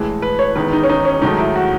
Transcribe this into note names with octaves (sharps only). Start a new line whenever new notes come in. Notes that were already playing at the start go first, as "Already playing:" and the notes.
Already playing: A2 E3 G#3 A4
B4
C#5
E2 D#3 G#3 B4
D#4
C#4
D#4
C#4
G#2 D#3 F#3 A3 D#4
E4
F#4